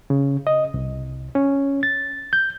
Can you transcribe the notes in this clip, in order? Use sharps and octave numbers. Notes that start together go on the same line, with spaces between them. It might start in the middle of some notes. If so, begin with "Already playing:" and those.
C#3
D#5
C2
C#4
A6
G6